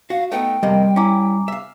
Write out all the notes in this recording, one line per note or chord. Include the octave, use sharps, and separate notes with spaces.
F#4 F5
A3 B3 D#4 G5
F2 C3 G3 A#3 D#5
C#4 E4 G#5 A#5 D6
E5 F5